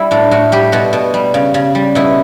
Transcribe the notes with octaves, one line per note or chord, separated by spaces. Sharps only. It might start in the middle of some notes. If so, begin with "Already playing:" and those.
Already playing: G3 E4 G4
A2 D4
A2 F#4
G3 G4
B2 F#4
B2
G3
C#3
C#3
G3
B2 E4